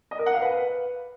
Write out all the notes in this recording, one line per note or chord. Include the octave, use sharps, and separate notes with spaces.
D#5
A#4
F#5
F5
B4